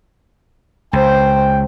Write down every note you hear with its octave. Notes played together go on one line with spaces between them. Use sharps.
C#2 C5 G5